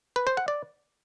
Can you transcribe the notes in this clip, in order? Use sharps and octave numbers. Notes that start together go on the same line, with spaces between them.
B4
C5
F#5
D5